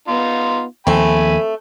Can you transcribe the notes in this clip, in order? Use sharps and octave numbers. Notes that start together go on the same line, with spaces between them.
B3 D#4 F4
D#2 F3 A3 C4 A4 G#5 B5